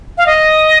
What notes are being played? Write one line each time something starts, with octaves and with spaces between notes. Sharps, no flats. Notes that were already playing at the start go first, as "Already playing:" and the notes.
F5
D#5